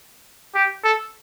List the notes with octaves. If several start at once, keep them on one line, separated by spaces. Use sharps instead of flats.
G4
A4